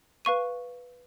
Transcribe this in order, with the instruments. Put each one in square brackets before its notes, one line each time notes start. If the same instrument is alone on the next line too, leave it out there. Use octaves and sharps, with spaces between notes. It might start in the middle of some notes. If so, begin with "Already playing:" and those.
[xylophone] B4 F5 C#6 D#7